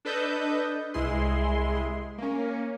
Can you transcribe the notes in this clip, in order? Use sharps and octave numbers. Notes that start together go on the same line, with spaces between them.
D4 A4 B4 D#5 G6
C2 G#3 E4 G#4 C6
A#3 C#4